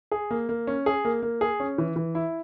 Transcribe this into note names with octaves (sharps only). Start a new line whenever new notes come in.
G#4
A#3
A#3
C#4
G#4
A#3
A#3
G#4
C#4
E3
E3
E4